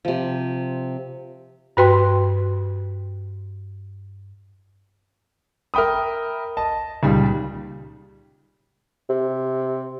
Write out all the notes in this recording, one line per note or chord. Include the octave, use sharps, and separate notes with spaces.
C3 F3
G2 F#4 B4 G5 C6
A#4 E5 G5 B5 D#6
D#5 A5
C#2 A#2 D#3 G3
C3